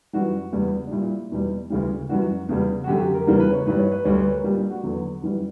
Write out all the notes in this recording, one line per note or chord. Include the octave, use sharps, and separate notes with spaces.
F#2 E3 G3 F#4
E2 C#3 G3
D4
A#2 G3 E4
E2 B2 G3
D2 C#3 E3 G3
F#2 E3 G3 F#4
E2 C#3 G3
F#4
F#2 D3 F#3 G4
G4
A#4
E2 C#3 E3 G3 A#4
B4
C#5
G2 E3 G3 B4
C#5
B4
D2 D3 G3 C#5
B4
A#4
A#2 G3 G4
D4
F#4
E2 D3 F#3
F#2 E3 G3